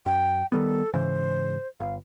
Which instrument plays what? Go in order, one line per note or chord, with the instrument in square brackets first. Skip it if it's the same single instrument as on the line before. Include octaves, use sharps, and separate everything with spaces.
[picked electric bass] F#2 [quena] G5
[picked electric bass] D#3 G3 B3 [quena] A4
[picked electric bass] G#2 C#3 E3 [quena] C5
[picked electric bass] G1 [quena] F5